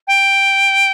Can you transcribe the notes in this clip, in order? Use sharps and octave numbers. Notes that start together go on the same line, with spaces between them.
G5